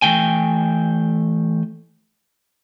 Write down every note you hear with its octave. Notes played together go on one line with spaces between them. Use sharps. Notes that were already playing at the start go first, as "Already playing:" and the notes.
E3 A3 G5 G#5